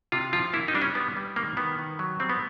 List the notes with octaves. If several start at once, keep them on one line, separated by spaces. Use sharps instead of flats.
C3 F4
F3 F4
A#3 E4
D#4
G3 D4
C#4
G3 B3
G3
D#3 A#3
D#3 B3
D#3
F#3
G3 C4
B3